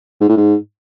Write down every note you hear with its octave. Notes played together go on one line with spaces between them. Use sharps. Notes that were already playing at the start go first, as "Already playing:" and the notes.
G#2
A2
G#2